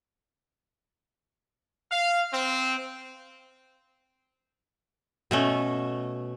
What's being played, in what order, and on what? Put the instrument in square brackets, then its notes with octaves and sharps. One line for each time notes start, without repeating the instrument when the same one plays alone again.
[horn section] F5
C4
[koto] B2 A3 C#4